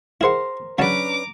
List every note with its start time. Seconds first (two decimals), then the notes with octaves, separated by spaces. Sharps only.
0.21 E4 G#4 A#4 C5 F#5
0.78 C#3 F#3 C#4 D4 B4 A5 A#5 D6